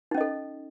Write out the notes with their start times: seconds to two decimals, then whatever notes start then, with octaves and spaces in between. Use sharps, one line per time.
0.11 D#4
0.14 C#4
0.18 D#5
0.21 A4